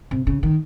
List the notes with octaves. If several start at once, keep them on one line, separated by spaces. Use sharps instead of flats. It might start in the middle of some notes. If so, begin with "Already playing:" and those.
C3
C#3
D#3